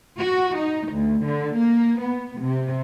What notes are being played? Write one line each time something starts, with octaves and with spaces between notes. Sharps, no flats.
F#4
D#4
D2
D3
A#3
B3
C3